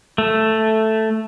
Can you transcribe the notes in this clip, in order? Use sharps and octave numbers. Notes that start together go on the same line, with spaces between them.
A3